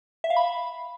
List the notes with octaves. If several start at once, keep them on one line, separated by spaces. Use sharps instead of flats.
E5
F5
B5